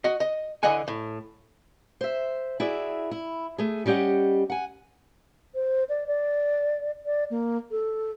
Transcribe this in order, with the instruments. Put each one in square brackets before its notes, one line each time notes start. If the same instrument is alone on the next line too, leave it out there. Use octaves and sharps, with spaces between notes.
[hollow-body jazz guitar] F#4 D#5
D#5
D3 E3 D#5 F#5 G#5
A2
[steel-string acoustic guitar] C5 E5
E4 F#4 G#4 D5 E5
E4
A3 G#4
G3 C#4 G4 D#5 F#5
F#5 G#5
[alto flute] C5
D5
D5
D5
A#3
A4